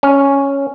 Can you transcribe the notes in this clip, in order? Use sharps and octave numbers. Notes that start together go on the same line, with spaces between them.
C#4